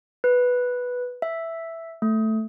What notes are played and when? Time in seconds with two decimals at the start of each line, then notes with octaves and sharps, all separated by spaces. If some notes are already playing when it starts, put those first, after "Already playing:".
0.24 B4
1.22 E5
2.02 A3